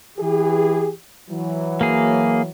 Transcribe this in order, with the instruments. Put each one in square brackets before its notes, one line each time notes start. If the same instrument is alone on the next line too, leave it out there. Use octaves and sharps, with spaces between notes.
[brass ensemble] E3 G4 G#4
E3 F#3
[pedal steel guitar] A#3 G#4